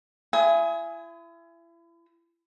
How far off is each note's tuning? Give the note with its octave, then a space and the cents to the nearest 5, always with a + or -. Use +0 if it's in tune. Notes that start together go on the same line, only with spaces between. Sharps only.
E4 +35 G#5 +0 D#6 +30